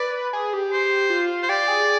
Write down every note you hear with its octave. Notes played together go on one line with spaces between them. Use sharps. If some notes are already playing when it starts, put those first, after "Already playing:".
Already playing: B4 D5
G#4
G4
C5
F4
C5
G4 D5
G#4